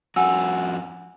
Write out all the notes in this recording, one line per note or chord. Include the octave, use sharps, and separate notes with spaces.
F2 F#4 F#5 G#5 E6